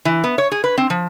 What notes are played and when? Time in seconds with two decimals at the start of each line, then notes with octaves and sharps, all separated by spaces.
0.05 E3
0.24 B3
0.38 C#5
0.52 G#4
0.64 B4
0.78 C4
0.90 F3